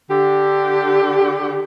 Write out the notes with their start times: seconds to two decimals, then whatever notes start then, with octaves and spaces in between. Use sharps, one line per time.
0.11 D3 G4